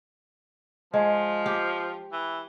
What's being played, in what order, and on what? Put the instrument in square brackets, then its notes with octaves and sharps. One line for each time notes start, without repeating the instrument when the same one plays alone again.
[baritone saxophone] F3 [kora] G#3
[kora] G4
[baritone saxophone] E3